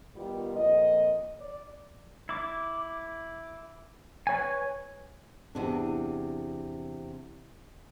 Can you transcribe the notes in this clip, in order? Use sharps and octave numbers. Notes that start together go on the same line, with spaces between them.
D#3 G3 B3 F4
F2 A#2 D#5
D5
E4 D6
B4 C#5 G#5
E2 C3 D4